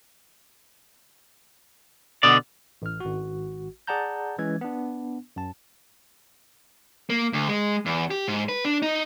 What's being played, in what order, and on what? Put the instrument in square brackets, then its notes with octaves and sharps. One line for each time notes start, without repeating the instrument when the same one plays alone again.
[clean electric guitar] B2 D3 D5 [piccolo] D#6
[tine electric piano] A1 F6
G#1 F#4
G#4 D5 F#5 A5 A#5 G6
E3 G#3 C#4 G#6
B3 D4
F#2 A5
[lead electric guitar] A#3
D2
G#3
E2
G4
G#2
B4
D4
D#4